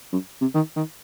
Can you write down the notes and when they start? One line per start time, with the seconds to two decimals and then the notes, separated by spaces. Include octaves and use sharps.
0.12 F#2
0.41 C3
0.55 D#3
0.76 D#3